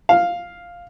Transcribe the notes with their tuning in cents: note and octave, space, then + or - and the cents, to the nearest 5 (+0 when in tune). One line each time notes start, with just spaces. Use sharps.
F5 +5